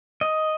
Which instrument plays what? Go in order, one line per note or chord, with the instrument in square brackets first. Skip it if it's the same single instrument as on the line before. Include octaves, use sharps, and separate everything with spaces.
[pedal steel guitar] D#5